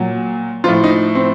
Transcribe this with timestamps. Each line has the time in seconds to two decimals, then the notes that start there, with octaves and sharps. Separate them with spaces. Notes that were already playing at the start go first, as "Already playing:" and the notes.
Already playing: A#2 F#3
0.64 A2 F3 F4
0.84 D#4
1.15 C4